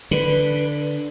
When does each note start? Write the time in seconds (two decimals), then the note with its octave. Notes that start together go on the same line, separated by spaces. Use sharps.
0.11 D3 B4